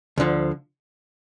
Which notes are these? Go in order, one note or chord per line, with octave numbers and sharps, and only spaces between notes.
D2 D3 F3